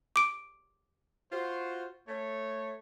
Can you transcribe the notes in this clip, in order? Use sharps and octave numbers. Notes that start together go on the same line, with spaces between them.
D6 D7
F4 F#4 C5
A3 C#5